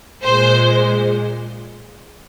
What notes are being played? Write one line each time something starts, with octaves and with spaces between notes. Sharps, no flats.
A#2 G#3 C5